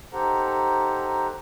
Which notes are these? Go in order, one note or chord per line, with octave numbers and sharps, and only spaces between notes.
D#4 G4 A4 C5 F#5 A#5